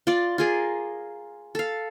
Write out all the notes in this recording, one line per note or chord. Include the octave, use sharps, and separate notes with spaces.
F4 D5
F4 G#4 A#4
A4 F5